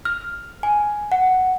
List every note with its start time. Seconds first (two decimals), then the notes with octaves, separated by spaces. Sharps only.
0.05 F6
0.63 G#5
1.12 F#5